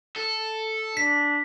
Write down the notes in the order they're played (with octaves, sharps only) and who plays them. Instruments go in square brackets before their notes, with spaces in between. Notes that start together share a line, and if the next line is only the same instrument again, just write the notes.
[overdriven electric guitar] A4
[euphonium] D4 [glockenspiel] B6